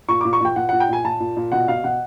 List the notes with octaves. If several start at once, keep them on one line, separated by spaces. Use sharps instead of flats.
A#2 C#6
A#2 D6
C#6
A#2 G5
A#2 F#5
A#2 F#5
G5
A#2 G#5
A#2 A5
A#2
A#2
B2 F#5
B2 F5
B2 F#5